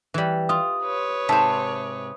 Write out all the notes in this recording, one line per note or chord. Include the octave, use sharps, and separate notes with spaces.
E3 G3
F4 D#6
B4 C#5
G#2 C3 C5 E5 A5